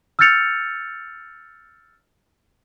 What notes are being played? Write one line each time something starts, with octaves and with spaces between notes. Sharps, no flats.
E6 F6 G6 A6 C#7 F7